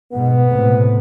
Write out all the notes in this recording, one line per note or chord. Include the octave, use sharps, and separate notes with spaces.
G#2 B2 B3
A2 C3